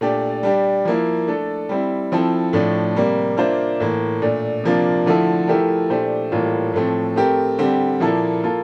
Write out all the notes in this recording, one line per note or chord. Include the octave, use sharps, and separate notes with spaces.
A#2 A3 D4 G4 D5
G3 D4 G4
F3 A#3 E4
A3 D4 A4
G3 C4 E4
F3 C4 E4 A4
A2 F3 A3 D4
C3 G3 A#3
A#3 D4 F4 C5 E5
A2 E3 A#3
A#2 A3 D4
C3 F3 A#3 D4 F4
D3 F3 A3 E4 A4
F3 A3 E4 G4 A#4
A#2 A3 D4 G4 C5
A2 E3 G3 A#3 F4
A2 F3 A3 C4
A3 C4 G4 A#4
D3 G3 C4 G4
A#2 F3 A#3 E4 A4
A#3 F4 A4